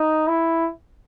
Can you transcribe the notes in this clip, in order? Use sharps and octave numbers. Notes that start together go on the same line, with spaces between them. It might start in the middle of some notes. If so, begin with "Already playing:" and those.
Already playing: D#4
E4